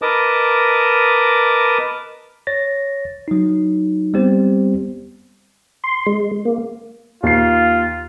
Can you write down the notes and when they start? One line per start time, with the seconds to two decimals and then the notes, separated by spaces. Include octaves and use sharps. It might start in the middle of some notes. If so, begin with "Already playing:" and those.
0.02 A#4 B4 D#5 A5 D6 D#6
2.47 C#5 A6 A#6
3.28 F#3 D#4
4.14 G3 B3 C4 G4 C5
5.84 C6
6.06 G#3
6.45 A#3
7.23 D#2 F4 C7